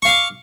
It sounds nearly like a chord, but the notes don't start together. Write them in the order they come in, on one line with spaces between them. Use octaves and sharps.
C#6 F5 D6